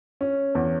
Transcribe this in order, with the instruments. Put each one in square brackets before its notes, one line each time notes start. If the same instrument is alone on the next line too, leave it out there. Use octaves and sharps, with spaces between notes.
[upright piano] C#4
E2